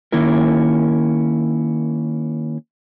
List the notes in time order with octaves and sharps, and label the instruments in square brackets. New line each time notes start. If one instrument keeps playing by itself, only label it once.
[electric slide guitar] D#3 A#3 C#4 E4 A#4